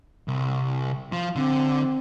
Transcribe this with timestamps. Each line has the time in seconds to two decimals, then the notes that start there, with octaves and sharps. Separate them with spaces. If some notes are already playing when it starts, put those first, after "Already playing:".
0.28 C2
1.12 F3
1.36 D3 C4